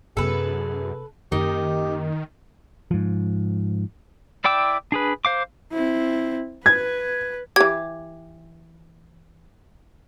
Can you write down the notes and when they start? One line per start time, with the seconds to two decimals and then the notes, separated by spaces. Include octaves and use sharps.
0.17 F#2 C3 B3 G#4 A4 B4
1.32 F#2 D#3 A#3 D#4 G4 A#4
2.91 G#2 F3
4.44 E4 D5 G5 D6 E6
4.92 D4 G#4 B4
5.25 C5 F5 D6
5.73 C4 E4
6.66 B4 G#6
7.56 E3 G4 G#6